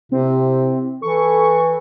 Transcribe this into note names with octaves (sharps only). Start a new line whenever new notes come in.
C3 C4 E4
E3 A4 C#6